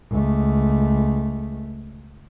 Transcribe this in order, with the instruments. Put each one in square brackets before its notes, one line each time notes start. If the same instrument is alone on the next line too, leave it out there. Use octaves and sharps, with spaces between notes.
[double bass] C#2 A3